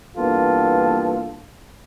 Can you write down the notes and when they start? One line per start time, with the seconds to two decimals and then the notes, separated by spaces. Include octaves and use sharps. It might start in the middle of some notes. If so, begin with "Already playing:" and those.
0.17 G2 E3 A#3 B3 F4 A4